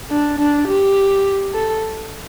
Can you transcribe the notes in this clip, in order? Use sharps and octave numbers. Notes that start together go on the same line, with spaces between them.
D4
D4
G4
A4